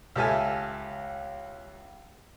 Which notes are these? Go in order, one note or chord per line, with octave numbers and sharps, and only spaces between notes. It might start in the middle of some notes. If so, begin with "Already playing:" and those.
C#2 G4 A4 E5 G#5 F6